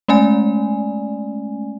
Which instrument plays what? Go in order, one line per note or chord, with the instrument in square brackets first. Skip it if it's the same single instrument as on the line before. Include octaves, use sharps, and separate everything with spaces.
[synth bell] G#3 A3 C#4 D5 G#5